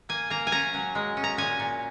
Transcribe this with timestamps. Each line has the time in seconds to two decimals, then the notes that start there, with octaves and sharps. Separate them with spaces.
0.09 A#3 G#5
0.30 A#3 A#5
0.47 G#5
0.52 C#4 A#5
0.74 F#3
0.95 G#3
1.17 C#4
1.24 A#5
1.38 A#2 G#5
1.60 A#2